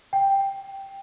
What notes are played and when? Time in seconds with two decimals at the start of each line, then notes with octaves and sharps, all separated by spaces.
0.13 G5